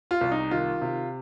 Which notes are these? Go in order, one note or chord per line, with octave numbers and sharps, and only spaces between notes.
F4
C2
D#4
D#3 F4
C3